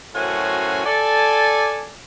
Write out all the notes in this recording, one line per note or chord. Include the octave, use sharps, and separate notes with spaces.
F#2 A2 C#4 F#4 C5 G#5
A4 D5 G#5